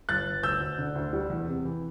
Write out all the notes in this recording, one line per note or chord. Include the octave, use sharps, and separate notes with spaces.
G1 F#6 A6
G1
D2 E6 G6
D2
D3
D2
G3
E2
C3
E3